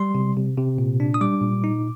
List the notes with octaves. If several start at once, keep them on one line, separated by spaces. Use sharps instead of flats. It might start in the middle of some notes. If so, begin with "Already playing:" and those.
Already playing: G3 C6
C3
C3
C3
A#2
D4
D#6
G3 D6
A#2
D#4